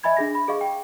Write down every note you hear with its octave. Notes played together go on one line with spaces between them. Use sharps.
D#5 E5 G#5 B5 G#6
D4 G#4 A#6
B5
G#4 D#5 F5 C#6
G5